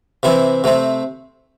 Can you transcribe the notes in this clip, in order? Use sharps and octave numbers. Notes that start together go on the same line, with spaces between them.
C3 E3 C4 E4
C3 A3 C4